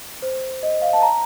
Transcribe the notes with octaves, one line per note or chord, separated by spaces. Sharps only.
C5
D#5
F5
A5
A#5